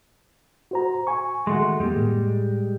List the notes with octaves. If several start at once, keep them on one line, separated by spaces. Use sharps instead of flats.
F#4 C5 A#5
G#5 C#6
D#3 G#3 A3 F#4 C6
F2 G3 G#3 A#3
A2